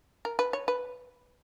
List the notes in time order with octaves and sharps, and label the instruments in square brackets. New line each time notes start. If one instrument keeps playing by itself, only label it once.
[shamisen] A#4
B4
C#5
B4